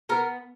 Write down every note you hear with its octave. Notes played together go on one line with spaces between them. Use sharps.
B3 A#4